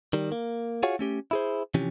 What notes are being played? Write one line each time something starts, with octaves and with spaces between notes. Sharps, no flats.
D#3 G3
A#3
F4 F#4 G#4 C#5 F5 F#5
A3 C#4 G4
E4 G#4 C5
C3 E3 F3 C#4 G4